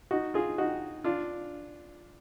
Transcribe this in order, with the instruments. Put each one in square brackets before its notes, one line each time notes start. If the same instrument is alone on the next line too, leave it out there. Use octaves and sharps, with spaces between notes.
[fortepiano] D#4 F#4
F4 G#4
D#4 F#4
D4 F4